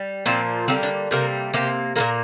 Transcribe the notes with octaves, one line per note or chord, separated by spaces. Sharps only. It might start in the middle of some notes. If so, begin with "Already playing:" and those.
Already playing: G3
A#2 F3 A#3 C4
D3 G3 A#3 C4
D4
C3 G3 A#3 A#4
C3 A#3 G4
A#2 F3 A#3 A#4